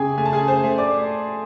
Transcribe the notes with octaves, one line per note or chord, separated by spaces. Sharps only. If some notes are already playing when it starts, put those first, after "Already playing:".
Already playing: C#3 G4 G#4 G5 G#5
A3 G#5
A5
G#4 G#5
C5 C6
A3
D5 D6